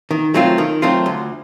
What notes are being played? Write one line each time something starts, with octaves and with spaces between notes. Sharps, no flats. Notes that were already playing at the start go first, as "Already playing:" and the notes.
D#3
F#3 A3 C4 F4
D#3
F#3 A3 C4 F4
D2